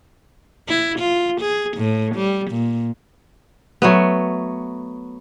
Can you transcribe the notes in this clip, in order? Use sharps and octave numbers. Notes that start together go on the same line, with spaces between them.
E4
F4
G#4
A2
G3
A#2
F#3 A3 B3